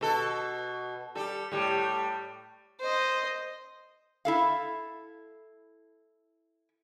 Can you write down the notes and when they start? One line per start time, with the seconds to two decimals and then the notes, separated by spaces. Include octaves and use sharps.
0.01 B2 A4
1.15 G3 A4
1.52 A2 G3
2.80 C5 D#5
4.25 E4 A4 F5